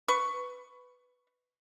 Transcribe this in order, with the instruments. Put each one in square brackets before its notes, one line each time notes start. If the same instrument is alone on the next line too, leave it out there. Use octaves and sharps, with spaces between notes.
[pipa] B4 C#6